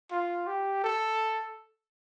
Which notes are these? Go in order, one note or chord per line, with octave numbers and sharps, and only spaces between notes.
F4
G4
A4